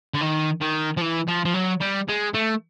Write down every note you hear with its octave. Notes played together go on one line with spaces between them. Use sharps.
D3
D#3
D#3
F3
E3
F3
F3
F#3
G3
G#3
A3